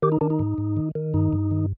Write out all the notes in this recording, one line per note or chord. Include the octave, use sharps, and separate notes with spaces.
D#3 G4
D#4
D#3 D4
D#4
G#2
G#2
D#3
D#3
G2 D#4
G2
D#3